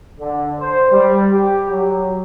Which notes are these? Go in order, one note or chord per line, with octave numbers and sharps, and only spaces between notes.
D3
C5
G3
G4
F#3